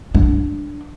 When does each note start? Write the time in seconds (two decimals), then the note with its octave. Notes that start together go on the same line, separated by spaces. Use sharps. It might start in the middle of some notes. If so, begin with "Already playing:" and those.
0.15 D4